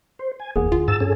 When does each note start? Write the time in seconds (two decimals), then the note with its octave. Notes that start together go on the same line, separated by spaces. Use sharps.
0.19 C5
0.40 G#5
0.56 F1 E2 A#3 G#4 F#5
0.72 D2 F4
0.88 G#2 A5 E6
1.00 G2 C#4 G#4 A4